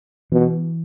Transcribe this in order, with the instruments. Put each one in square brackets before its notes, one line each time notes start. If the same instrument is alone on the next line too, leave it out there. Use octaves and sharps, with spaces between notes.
[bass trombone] B2 [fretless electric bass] E3